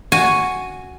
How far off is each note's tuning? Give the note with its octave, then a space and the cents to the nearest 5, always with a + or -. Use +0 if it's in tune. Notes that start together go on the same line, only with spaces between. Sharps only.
F#4 +0 G#5 +0